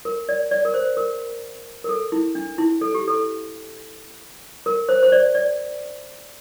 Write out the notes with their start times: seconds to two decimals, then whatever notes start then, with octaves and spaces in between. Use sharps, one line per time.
0.05 A#4
0.29 D5
0.51 D5
0.65 A#4
0.74 C5
0.97 A#4
1.84 A#4
1.89 A4
2.12 E4
2.35 D4
2.58 E4
2.81 A4
2.94 G4
3.08 A4
4.66 A#4
4.89 C5
5.03 C5
5.12 D5
5.35 D5